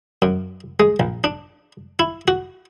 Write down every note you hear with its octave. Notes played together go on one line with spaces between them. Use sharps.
F#2
G#3
A#1
D4
E4
F#4